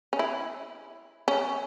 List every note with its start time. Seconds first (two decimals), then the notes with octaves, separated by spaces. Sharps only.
0.13 C#4
0.19 E4
1.28 C#4